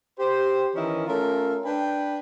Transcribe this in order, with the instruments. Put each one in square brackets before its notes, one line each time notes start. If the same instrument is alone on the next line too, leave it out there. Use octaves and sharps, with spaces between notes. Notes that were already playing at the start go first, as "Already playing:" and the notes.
[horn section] G4 C5
D#3 E3 C#4 E4 A#4 D#5
A3 C#4 F4 A#4
D4 B4 G5